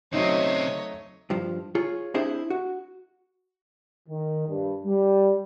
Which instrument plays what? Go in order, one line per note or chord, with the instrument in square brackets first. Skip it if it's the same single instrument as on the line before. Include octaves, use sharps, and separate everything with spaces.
[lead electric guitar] C#3 C4 [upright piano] F#3 A3 D#4 [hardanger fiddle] C#5 D#5
[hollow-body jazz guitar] G2 F3
F4 G#4 C#5
C4 D4 E4 G#4 C5 E5
F#4
[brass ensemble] D#3
G2
G3